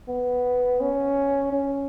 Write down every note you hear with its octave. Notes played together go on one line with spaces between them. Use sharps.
B3
C#4
C#4